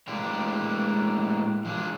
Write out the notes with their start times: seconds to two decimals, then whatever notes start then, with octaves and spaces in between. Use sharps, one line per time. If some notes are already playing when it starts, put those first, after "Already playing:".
0.08 A2 G#3 A#3 D4 G4
1.65 F3 D4 G#4